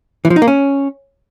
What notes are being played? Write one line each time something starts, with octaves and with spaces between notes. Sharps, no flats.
E3
F3
D#4
A#3
C#4